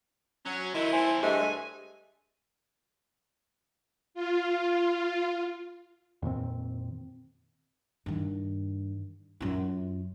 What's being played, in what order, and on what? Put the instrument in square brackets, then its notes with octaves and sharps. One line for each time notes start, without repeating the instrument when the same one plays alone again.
[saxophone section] F#3 [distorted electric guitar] C#4
[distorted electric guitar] D3 D#4 [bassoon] D#3 [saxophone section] E4 [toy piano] C6
[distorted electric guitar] E2 A2 [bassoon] C5 [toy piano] G#5
[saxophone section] G2 A3 [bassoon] G#3 [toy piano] G4 C5 E5 [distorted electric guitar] G#5
[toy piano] D5
[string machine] F4
[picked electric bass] F2 A#2 D#3 C4
[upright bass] G2 D#3
F#2 F4